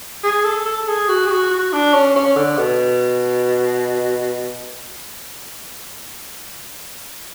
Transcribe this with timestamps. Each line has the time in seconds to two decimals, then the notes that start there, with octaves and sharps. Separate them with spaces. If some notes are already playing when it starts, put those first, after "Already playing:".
0.23 G#4
0.44 A4
0.65 A4
0.88 G#4
1.08 F#4
1.26 G#4
1.30 F#4
1.51 F#4
1.72 D4
1.94 C#4
2.15 C#4
2.36 D3
2.58 B2